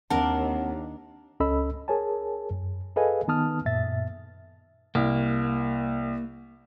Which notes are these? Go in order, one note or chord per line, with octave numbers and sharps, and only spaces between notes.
D#2 C4 D4 A#4 F#5 A5
C#2 C#4 A4 D#5 B5 E6
G#4 A#4 C#5 G#5 A5
F#2
G#4 A4 B4 D#5 F5 G#5
D#3 B3 D#4 A5 D#6 F6
F#2 A#2 E5 A6
C2 A#3